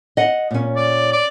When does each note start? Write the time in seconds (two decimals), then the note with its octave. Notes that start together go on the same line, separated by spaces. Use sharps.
0.17 D#5 F#5
0.51 A#2 C#4
0.76 D5
1.12 D5